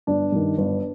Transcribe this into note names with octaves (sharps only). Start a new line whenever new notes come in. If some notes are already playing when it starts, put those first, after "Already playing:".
G1 D4
G2 D#3
G1